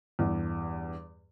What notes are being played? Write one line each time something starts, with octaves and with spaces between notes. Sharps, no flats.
E2 G2